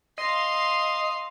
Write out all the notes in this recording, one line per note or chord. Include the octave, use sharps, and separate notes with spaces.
D#5 F5 C6